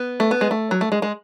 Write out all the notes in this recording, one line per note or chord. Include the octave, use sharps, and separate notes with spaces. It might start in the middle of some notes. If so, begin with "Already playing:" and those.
Already playing: B3
A3
B3
G#3
A3
F#3
A3
G#3
G#3